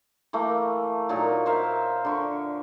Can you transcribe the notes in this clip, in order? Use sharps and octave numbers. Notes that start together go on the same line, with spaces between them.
E3 A3 A#3
A#2 F#3 D#4
A#4 C5 E5 F5
D3 C#6